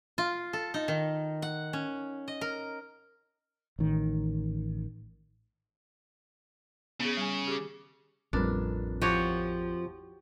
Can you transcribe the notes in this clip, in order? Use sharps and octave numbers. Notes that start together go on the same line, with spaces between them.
F4
A4
D#4
D#3
F#5
C#4
D#5
A#4
A1 D#3
C#3 B3 G#4
G3 G#5
G4 G#4 D6
A1 F2 G3 D4 A#4 B4
F3 F#4 G4 C#5